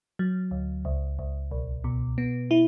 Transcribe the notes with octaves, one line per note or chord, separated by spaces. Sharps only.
F#3
D2
C#2
C#2
B1
B2
B3
E4